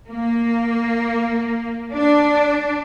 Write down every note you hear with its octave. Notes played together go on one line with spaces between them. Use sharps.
A#3
D4